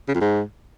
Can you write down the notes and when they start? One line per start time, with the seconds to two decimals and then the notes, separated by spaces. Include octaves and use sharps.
0.08 C#3
0.15 F2
0.21 G#2